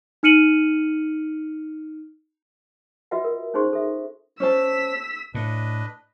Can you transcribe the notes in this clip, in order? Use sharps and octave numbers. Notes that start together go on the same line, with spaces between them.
D#4 F6 C#7 D#7 F#7
F4 F#4 B4 D#5 E5 F#5
A#4
C#4 D#4 G#4 C5 C6 C#6
A4 E5
C#4 C5 A5 E6 B6
A2 D4 B4 D#5